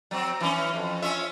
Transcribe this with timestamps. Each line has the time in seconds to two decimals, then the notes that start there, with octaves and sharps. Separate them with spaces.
0.11 F#3 C4
0.41 E3 C#4
0.74 F2
1.02 C#4 F4 E5